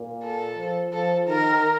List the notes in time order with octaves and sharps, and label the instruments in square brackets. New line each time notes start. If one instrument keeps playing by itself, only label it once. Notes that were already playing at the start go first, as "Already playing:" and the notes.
Already playing: [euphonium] A#2
[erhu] A4
[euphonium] F3
[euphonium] F3 [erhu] A4
[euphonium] D#3 [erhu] A#4